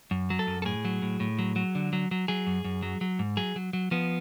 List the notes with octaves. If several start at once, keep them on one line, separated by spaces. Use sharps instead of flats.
F#2
F#3
A4
F#2
A4
A2 G#4
F#3
A2
A2
F#3
F#3
D3
F#3
F#3
F#3 G#4
F#2
F#2
F#3
F#3
G#2
F#3 G#4
F#3
F#3
F3 B3